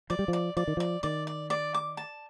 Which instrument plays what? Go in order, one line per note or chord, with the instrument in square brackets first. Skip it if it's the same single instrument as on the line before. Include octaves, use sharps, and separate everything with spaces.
[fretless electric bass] F3 [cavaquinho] D5
[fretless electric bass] G3
[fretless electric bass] F3 [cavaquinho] D5
[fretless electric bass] F3 [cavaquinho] D5
[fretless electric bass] D#3
[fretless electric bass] F3 [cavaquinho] D5
[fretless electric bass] D#3 [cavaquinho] D5
[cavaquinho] D5
D5
D6
A5